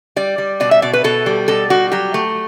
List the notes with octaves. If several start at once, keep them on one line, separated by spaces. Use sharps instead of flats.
G3 D5
G3
B2 D5
E5
B2 D5
B4
B2 A4
G3
B2 A4
G3 F#4
F#3 G4
A3